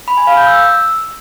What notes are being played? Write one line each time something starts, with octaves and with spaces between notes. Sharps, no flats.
B5
G#5
F5
G6
E6